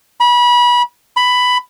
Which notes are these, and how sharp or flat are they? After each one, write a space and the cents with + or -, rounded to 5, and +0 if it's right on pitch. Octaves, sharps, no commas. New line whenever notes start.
B5 -30
B5 +10